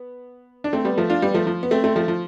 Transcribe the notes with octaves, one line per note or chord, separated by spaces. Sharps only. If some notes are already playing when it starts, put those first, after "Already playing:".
Already playing: B3
D4
A3 C4
G3 B3
F3 A3
D4 F4
G3 B3
F3 A3
F3
B3
A3 C4
A3 C4
F3 A3
F3